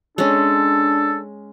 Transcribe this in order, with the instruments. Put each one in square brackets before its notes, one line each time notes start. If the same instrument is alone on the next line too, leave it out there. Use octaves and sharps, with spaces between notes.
[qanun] G#3 C#4 [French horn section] D4 [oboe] A4